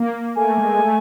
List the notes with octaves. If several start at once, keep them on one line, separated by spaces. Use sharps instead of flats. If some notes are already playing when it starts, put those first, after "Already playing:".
Already playing: A#3
A3 G#5
G#3
A3